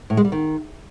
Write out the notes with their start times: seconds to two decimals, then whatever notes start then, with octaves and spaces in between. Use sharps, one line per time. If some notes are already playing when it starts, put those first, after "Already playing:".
0.10 A2
0.17 G#3
0.25 G3
0.32 D#3